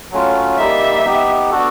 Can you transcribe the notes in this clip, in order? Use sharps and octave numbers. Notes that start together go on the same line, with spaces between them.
F#3 A3 C#4 F4
G3 A#3 D#4 E5
B3 D#4 G4
B3 D4 F#4 A4